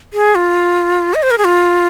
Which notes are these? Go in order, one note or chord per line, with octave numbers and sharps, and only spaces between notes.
G#4
F4
D#5
C5
A#4
G#4
F4